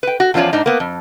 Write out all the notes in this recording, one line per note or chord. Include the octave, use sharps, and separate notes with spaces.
B4 G5
F#4
E2 F3 C#4 F4 C#5 D5
G#2 D4 D#4
A#3 B3
F2